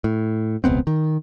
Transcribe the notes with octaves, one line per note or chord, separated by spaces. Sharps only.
A2
E1 C#2 B3 C4
D#3